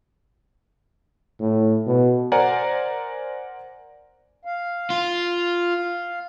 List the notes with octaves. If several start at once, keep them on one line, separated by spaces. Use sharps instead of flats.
A2
B2
A#4 C5 D5 F#5 G#5 A#5
F5
F4